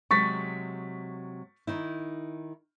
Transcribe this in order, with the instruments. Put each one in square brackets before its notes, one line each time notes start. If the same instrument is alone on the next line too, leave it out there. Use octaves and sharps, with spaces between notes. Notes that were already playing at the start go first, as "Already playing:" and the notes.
[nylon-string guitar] C3 F#3 G#3 [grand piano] C#6 A6 B6
[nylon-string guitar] D#3 D#4 E4